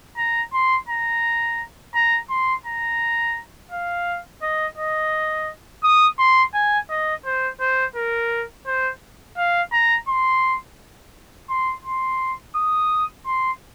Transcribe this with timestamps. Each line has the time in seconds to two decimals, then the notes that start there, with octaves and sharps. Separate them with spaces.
0.17 A#5
0.53 C6
0.89 A#5
1.95 A#5
2.30 C6
2.66 A#5
3.71 F5
4.42 D#5
4.77 D#5
5.84 D#6
6.19 C6
6.54 G#5
6.90 D#5
7.25 C5
7.60 C5
7.96 A#4
8.66 C5
9.37 F5
9.72 A#5
10.08 C6
11.49 C6
11.85 C6
12.56 D#6
13.27 C6